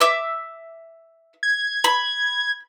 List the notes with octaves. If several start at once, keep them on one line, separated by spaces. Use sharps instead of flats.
E5 D6 E6
G#6
B5